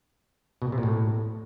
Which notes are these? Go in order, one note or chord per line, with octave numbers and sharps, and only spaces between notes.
B2
A#2
C3
A#2
A2